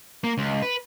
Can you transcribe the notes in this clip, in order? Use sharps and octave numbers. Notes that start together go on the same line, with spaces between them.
A#3
C#2
B4